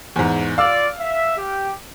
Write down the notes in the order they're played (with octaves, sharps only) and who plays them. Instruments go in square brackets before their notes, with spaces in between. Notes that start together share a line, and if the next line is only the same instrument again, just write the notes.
[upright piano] E2 G#2
[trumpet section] F4 D5 [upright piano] F5 E6
[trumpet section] E5
G4